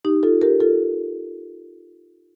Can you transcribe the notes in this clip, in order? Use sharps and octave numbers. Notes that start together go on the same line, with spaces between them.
D#4 G4
F4 A4
G4 A#4
F4 A4